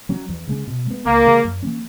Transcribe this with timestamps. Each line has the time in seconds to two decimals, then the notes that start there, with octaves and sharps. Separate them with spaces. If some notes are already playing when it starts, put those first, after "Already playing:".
0.09 F#3 C#4
0.29 E2
0.48 C#3 G#3 C#4
0.68 B2
0.87 G#3 B3
1.05 C#2 A#3
1.24 C#3 E3 G#3
1.45 F#2
1.63 E3 A#3 C#4